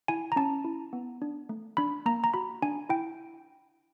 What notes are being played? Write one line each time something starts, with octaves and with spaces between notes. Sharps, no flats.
E4 G#5
A#5
C#4 A5
E4
B3
D4
A3
D4 B5
A#3 A#5
A#5
F#4 B5
D4 G#5
E4 G5